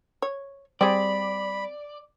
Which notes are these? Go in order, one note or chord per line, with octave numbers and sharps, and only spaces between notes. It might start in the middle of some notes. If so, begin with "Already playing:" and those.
C#5
G3 C4 G#4 D5 B5